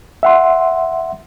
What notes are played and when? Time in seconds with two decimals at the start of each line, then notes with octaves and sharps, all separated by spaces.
0.23 E5 F#5 C6